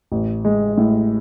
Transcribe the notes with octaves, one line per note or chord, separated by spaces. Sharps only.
A1
G#3
A2